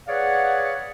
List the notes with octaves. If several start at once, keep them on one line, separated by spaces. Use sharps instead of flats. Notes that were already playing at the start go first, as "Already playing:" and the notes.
G#4 B4 C#5 D5 F5 F#5